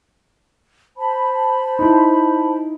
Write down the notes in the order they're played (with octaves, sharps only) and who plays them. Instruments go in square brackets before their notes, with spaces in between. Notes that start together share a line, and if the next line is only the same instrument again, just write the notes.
[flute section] C5 A5 B5
[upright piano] D#4 E4